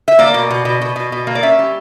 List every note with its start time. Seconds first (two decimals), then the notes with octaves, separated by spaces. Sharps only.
0.08 E5
0.19 A#3 D5
0.34 B2
0.50 B2
0.65 B2
0.81 B2
0.96 B2
1.12 B2
1.27 A#3
1.35 D5
1.43 C#4 E5
1.59 G3